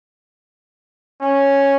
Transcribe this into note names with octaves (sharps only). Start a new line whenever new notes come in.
C#4